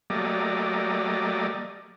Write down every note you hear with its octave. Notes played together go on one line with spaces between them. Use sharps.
F#3 G3 A3 A#3 D5 D#5